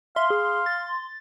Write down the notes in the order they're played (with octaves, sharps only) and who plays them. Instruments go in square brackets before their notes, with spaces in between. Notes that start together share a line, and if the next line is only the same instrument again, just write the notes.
[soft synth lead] E5 [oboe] F5 [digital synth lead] C6
[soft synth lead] G#4
A6